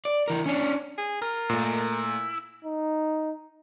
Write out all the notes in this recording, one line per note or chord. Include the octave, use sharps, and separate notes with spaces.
D5
E3 A#4
C#4 D4
G#4
F4 A#4
A#2 A3 C5 D#5
E4
D#4